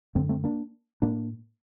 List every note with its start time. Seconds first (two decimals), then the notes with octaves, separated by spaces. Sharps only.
0.15 F#2 D3 A3 C4
0.29 A3 C4
0.44 A#3 D4
1.02 A2 A#3 D4